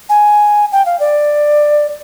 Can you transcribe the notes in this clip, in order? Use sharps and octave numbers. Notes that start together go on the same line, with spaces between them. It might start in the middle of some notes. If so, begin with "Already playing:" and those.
G#5
G5
F5
D5